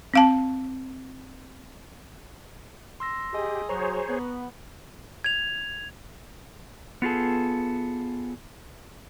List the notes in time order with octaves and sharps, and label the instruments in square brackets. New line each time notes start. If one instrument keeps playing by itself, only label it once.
[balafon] C4 F5 A5
[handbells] C6 E6 A#6
[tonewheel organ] G4 [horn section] G#4 D#5
[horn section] F#3 [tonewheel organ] G#4 C5 C#5 [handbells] A#5 C#6
[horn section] B3
[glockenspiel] G#6 F7
[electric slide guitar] B3 F4 G#4 A4